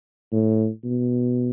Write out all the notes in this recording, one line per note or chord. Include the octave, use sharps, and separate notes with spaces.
A2
B2